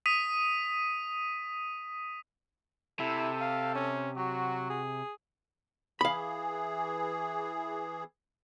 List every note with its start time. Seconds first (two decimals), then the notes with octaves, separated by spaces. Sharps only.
0.06 D#6 B6 D#7
2.99 C3 E4 A4
3.40 F5
3.75 C#4
4.16 F#3 F#4
4.70 G#4
6.01 E3 G#4 F5 B5